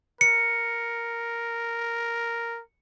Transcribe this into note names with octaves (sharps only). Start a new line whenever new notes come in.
A#4 C#7